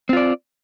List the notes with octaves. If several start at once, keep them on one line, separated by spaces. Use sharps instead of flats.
C4 F4 D5